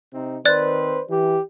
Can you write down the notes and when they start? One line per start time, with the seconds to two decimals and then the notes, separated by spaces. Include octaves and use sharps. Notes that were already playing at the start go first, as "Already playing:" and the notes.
0.14 C3 C4 D#4
0.45 D#3 C4 B4 C5 D5 F#6 A6
1.09 E3 G4